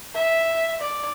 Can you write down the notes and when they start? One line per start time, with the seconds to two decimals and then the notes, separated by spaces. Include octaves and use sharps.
0.14 E5
0.80 D5